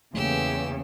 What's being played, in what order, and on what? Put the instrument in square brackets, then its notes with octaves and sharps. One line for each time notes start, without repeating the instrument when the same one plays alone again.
[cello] E2 C#3 [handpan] A3 A#3 [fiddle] G4 E6